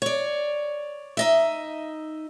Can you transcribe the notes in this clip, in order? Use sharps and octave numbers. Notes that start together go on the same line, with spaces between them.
C#5 D5
D#4 D#5 E5